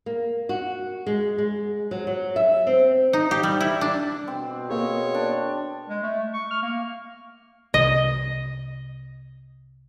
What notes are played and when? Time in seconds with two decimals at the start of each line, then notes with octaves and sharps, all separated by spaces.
0.06 A#3
0.49 F#4
1.07 G#3
1.38 G#3
1.91 F#3
2.07 F#3
2.36 E5
2.67 C4
3.13 D#4
3.31 G4
3.43 G3
3.61 E4
3.81 D4
4.28 B2 C4
4.69 A#3 G#4 C#5
5.14 D4
5.89 G#3
6.03 A3
6.34 C#6
6.51 F6
6.62 A#3
7.74 C2 D#5